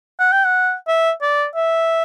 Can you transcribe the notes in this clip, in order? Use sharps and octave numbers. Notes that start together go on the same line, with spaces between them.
F#5
G5
F#5
E5
D5
E5